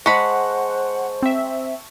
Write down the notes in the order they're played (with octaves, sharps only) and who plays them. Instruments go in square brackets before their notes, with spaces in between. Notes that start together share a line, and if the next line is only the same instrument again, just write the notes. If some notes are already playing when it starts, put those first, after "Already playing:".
[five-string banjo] G#3 B5 [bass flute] C5 [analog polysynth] F#5 [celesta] A5 C#6
[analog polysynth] C4 E5